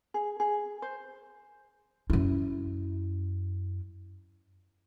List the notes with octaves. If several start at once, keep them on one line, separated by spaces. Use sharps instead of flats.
G#4
G#4
C5
F#2 E4